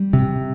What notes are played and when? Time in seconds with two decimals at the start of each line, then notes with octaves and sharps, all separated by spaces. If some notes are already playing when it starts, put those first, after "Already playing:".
Already playing: G3
0.13 C3